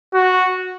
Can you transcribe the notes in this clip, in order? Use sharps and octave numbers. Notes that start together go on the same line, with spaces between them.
F#4